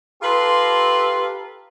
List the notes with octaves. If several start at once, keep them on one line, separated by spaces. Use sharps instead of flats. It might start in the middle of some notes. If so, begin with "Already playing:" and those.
F4 G4 A4 B4 A#5 C6